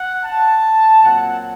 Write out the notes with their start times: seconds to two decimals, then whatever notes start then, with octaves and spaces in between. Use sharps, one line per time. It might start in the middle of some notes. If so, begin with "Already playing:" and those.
Already playing: F#5
0.25 A5
1.03 A#2 F#3 C4 F#5